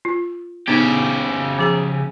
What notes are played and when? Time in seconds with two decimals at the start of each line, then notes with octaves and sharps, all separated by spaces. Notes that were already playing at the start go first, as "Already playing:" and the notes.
0.05 F4
0.68 C#3 B3 D4 D#4 G4
1.59 F3 G#4 A#5